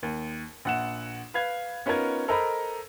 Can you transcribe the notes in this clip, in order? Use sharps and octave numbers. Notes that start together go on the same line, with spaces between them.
D#2
A#1 F#5 E7
B4 F5 G#6
B3 C#4 D#4 F4 A#4 G#6
A4 A#4 C5 D#5 A#5 B5